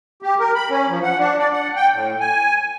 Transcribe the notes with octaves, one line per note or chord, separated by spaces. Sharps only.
G4
A#4
B5
C#4
F3
F#5
D4
D5
F#5
G5
A2
G#5